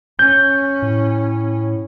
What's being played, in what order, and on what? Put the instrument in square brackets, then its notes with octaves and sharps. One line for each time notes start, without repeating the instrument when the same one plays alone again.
[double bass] C#4 [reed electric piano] G6
[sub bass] A2